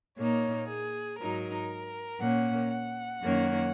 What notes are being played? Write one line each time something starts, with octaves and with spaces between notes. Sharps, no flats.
A#2 A#3 D#4 C#5
G#4
G#2 F#3 D#4 A#4
A#2 A#3 C#4 F#5
F#5
F#2 D#3 A#3 C#4